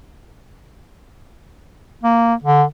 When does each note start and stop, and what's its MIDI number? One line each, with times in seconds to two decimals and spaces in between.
2.04 2.34 58
2.44 2.64 50